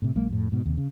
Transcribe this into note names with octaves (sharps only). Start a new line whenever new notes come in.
A2 C3
A#1 F#3 G#3 A#3
F2 A2
G#2 B2
D#2 C3
C#3